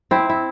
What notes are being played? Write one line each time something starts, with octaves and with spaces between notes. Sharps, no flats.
C4 E4
E4